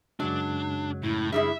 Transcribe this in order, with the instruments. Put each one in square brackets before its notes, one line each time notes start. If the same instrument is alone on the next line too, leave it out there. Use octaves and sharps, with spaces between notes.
[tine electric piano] F#2 C#3 G#3 [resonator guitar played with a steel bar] F#3 [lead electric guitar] D4
[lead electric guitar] A2 [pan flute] E4
[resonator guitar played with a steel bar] G2 G3 E4 [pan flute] G#4 [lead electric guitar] E5